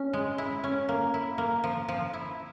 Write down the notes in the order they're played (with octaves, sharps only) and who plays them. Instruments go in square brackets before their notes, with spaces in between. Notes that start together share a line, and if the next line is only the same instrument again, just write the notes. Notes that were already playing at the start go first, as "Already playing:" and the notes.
Already playing: [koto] C#4
G#3
E4
C#4
A#3
E4
A#3
F3
F3
E4